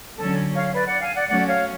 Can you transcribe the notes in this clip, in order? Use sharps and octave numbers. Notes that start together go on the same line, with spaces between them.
D3 F#3 C#4 A4
C#5 F5
B4 D5
D5 F#5
F5 G#5
D5 F#5
F#3 A3 C#4 D5 F#5
C#5 F5